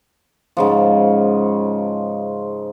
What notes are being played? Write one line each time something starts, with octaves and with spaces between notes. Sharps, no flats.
G#2 C#3 F3